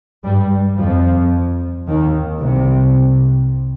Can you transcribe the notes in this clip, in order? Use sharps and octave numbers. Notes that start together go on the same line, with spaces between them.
G2 G3
F2 F3
D#2 D#3
C2 C3